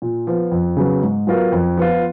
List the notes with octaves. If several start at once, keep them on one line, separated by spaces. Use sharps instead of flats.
A#2
F3 B3 F4
F2
C#3 F#3 B3
G#2
F#3 B3 F4 A#4
F2
F3 B3 F4